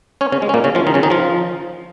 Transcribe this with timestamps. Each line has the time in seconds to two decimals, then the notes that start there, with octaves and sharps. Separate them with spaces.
0.21 C#4 C#5
0.32 C#3 C#4
0.42 G#3
0.49 C#4
0.54 A#2 A#3
0.64 C#3 C#4
0.75 F3 F4
0.87 D#3 D#4
0.94 C#3 C#4
1.03 D#3 D#4
1.10 F3 F4